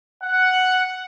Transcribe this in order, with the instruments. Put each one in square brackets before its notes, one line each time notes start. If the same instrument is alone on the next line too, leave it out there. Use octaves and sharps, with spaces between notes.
[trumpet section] F#5